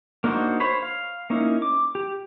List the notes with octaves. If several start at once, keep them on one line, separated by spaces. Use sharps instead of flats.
A#3 D4 D#4 F#4 C5
C5 C#5 B5
F5
A#3 C#4 D#4 E4
D6
G4